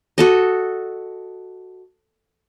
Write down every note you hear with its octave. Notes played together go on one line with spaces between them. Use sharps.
F#4 A4 D#5